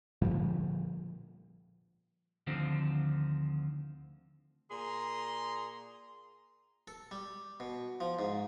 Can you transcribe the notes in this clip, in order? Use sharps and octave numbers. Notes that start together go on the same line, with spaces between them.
A#2 D3 F3 G3
D2 D3 D#3 F3 C4
A#2 G#4 A#5 C6
A4
G3
B2
F3
G#2